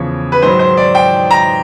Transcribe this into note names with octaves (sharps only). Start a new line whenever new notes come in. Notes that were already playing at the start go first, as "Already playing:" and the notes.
Already playing: E2 C#3 F3 C#5
B4
G#2 D#3 F#3 C5
C5
D5
G5
A#5